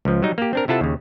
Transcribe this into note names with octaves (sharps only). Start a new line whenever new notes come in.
C#2 F3
F#3 G3 D#4
A#3 G4
C4 D4 A#4
C3 E4 F4 A4 F#5 A5
D#2 C#3